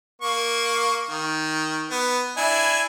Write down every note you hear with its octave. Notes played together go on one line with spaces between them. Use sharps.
A#3 C#6
D#3
B3
D4 E4 G#5